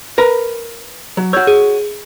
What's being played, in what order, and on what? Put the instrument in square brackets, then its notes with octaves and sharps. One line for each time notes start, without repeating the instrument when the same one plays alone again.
[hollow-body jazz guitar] A#4 B4 A#5
F#3
[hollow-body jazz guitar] F#4 C#5 [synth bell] E6 G6
[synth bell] G#4